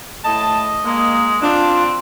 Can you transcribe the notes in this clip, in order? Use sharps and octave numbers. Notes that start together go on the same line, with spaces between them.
A2 A3 D#5 A5
G#3 A#3
C4 D4 F4